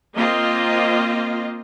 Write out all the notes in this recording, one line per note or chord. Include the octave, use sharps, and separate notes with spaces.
A#3 C4 F4 D#5